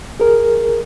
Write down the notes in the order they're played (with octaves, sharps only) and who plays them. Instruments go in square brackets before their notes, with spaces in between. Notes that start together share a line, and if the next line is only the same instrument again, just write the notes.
[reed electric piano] G#4 A#4